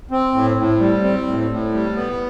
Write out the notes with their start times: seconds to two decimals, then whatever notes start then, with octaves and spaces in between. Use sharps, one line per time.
0.11 C4
0.34 A2
0.57 A2
0.80 G3
1.04 C4
1.27 A2
1.50 A2
1.73 G3
1.96 B3